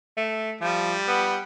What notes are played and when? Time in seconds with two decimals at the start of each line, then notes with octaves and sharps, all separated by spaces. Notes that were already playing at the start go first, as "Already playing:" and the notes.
0.17 A3
0.61 F3 G3
1.07 B3